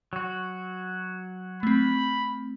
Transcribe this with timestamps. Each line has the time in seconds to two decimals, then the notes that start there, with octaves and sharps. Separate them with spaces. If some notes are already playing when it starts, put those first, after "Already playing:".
0.13 F#3 F#4
1.63 A3 C4 B5